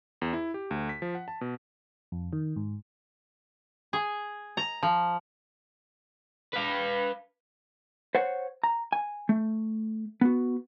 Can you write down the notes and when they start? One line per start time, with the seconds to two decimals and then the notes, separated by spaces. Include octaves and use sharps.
0.22 E2
0.33 E4
0.54 G4
0.71 D2
0.89 B6
1.02 F3
1.15 F#5
1.28 A5
1.41 B2
2.12 F2
2.33 D#3
2.56 G#2
3.93 G#4
4.57 A#5
4.83 F3
6.53 B4 F5
8.15 C5 C#5 F#5
8.63 A#5
8.92 G#5
9.29 A3
10.21 B3 F#4